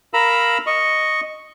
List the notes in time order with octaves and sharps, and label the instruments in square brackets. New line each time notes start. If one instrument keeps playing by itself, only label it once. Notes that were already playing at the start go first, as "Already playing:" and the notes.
[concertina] A#4 F5 A#5 B5 E6
D#5 C#6